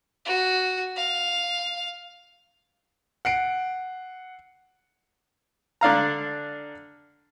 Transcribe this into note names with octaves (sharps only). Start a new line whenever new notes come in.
F#4
F5
F#5 C7 D7
D3 D4 F5 A#5